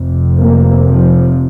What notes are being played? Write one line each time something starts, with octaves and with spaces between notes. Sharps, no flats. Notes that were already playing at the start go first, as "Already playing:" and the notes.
Already playing: F1 F2 C3
A#3
F3